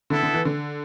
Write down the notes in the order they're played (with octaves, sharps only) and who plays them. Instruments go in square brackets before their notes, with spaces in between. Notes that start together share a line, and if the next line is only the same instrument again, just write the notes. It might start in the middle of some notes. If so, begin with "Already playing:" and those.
[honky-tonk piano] D3 [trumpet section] B3 E4 A4
[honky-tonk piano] D3
E3
D3